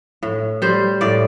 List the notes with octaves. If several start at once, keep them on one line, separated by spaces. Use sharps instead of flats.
A2
G3 C5
A2 D5